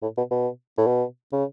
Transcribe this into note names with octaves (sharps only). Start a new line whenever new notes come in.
A2
B2
B2
A2
B2
C#3